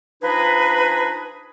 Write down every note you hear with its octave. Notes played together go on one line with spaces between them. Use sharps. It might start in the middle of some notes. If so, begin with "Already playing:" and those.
F3 D4 D#4 G#4 B4